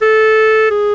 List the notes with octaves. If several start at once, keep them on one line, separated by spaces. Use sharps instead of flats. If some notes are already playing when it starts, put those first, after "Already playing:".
A4
G#4